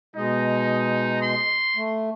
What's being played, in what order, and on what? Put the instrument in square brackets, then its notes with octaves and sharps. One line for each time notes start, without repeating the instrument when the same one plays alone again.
[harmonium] B2 G#3 D#5 [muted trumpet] D#4
[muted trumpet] C6
[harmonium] A3